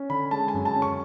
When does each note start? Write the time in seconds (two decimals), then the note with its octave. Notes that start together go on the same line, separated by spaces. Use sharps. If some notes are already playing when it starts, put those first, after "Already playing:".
Already playing: C#4
0.09 D3 B5
0.31 G#3 A5
0.48 G#5
0.54 F#2
0.65 A5
0.75 C#4
0.82 C#6